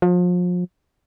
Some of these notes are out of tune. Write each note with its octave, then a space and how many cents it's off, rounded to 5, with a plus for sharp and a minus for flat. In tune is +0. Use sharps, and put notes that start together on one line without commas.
F3 +35